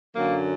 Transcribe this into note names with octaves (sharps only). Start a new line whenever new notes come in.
F#2 D3 F#3 A#3